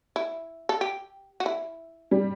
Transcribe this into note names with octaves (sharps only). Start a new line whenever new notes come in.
E4
A4
G4
F#4
E4
G3